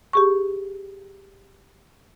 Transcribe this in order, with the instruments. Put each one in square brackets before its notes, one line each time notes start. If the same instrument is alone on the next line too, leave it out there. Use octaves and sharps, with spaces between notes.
[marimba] G4 G#4 C#6